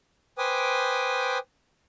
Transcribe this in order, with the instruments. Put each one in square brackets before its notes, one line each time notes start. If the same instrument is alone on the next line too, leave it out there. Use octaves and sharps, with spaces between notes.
[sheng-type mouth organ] B4 C5 G5 G#5 D6 D#6